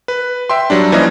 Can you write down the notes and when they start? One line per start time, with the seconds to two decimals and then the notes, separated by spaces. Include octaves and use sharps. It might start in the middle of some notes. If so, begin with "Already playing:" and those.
0.08 B4
0.49 E5 G5 C6
0.70 F#3 G3 D4
0.92 E3 F3 A#3 C#4 D#5